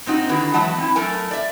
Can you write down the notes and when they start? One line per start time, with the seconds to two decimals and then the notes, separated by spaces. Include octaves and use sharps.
0.06 A#2 C4 D#4 F#4
0.29 D3 D#3 E4 F#4 B4
0.54 E2 F#3 G#3 E5 F#5 A5
0.78 C4 E4
0.95 F#3 A3 A4 A#4 G#5
1.31 D5 E5